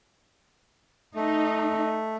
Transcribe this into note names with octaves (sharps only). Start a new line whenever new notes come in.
A3 D#4